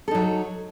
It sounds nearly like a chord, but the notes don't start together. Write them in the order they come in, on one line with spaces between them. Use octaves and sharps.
A4 D#4 F#3